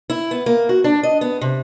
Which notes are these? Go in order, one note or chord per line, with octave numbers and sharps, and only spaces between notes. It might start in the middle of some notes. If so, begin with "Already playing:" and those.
E4
B3
A#3
F#4
D4
D#5
B3
C3